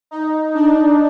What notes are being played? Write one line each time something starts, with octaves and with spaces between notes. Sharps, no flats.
D#4
D4